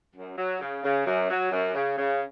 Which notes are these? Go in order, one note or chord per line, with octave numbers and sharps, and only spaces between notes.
F#2
F#3
C#3
C#3
F#2
F#3
F#2
C#3
C#3